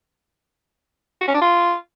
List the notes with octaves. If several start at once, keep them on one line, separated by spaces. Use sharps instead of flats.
F#4
C#4
D4
F4